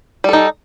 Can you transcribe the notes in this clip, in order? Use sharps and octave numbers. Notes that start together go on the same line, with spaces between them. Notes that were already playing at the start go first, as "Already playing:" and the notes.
G3 D#4 A4